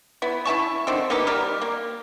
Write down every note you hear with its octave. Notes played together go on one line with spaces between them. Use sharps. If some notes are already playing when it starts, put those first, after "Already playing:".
B3 E4
E4 E5 A5 C#6
D3 D#3 C4
A#3 B3 D#4 G4
G3 G4 A#4
A#3